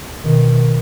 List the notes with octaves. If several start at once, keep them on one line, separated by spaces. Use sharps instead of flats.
B2 D#3